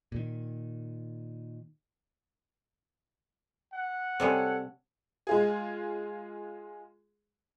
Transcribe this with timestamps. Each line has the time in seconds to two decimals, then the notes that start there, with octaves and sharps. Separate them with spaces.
0.12 A#2 D#3
3.73 F#5
4.20 C3 G3 G#4 A4 C#5
5.27 G#3 F4 G#4